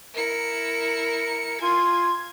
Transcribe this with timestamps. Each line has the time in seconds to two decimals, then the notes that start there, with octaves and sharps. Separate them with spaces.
0.14 E4 A#4 C#7
1.61 F4 G#5 C6 G#6